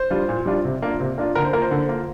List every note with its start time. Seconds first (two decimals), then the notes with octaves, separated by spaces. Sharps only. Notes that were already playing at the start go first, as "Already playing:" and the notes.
Already playing: C5
0.10 G3 D4 F4
0.29 A#2
0.46 G3 D4 F4
0.64 C3
0.82 A#3 D4 F4
1.00 C3
1.18 A#3 D4 F4
1.35 D3 A#4
1.45 C5
1.53 A#3 F4 A#4
1.62 C5
1.71 D3
1.89 A#3 F4